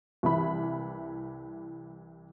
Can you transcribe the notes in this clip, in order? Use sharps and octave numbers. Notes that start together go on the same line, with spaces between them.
C2 E3 B5